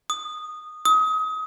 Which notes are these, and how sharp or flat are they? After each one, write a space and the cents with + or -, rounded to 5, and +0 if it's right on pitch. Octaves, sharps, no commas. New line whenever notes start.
D#6 -10
D#6 +30